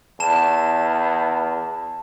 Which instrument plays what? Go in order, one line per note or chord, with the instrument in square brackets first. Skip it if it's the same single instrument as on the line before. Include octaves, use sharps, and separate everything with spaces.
[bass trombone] E2 [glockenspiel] A5 E7